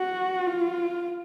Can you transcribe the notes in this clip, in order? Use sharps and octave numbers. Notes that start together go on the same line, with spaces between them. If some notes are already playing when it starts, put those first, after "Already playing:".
Already playing: F#4
F4